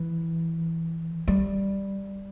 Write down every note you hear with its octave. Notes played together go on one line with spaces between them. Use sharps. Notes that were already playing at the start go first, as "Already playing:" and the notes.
Already playing: E3
G3